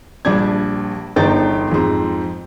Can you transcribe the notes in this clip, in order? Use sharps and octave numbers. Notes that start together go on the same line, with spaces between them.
A#1 G3 D4 G#6
G1 E2 D#4 A4 G5 A6
F2 G#2 C4